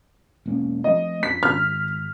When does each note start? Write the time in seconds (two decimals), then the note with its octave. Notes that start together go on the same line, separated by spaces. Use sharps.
0.46 E1 A#3 C#4
0.84 F3 A3 C4 D#5
1.23 F2 B6
1.43 G#1 F6